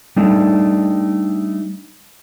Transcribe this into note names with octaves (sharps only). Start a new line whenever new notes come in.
G3 A3 D4 D#4